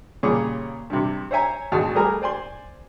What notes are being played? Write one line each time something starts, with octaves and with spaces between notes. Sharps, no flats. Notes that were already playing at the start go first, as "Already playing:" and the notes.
A#2 C#3 G3 G#4 C#5 D6
G2 C3
C5 C#5 E5 G#5 A#5
G#1 D2 F#4 G#4 A5
G3 A3 G#4 A#4 G#5
C5 D5 G#5 C6